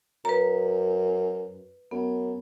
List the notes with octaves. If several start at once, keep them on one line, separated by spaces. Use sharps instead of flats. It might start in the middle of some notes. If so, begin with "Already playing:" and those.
F#2 B4 A#5
F#2 B3